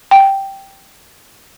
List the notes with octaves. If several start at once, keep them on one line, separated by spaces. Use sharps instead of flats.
G5